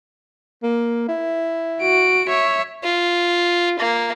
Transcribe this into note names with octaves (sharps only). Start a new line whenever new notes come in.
A#3
E4
F#4 D7
C#5 E5
F4
A#3